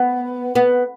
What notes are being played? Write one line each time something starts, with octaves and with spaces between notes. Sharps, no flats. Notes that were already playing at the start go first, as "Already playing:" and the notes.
Already playing: B3
B3